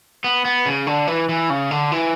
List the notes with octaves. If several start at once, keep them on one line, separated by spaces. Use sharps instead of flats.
B3
B3
C#3
D3
E3
E3
C#3
D3
E3